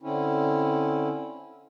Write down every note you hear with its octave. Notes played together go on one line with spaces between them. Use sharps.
D3 C4 C#4 E4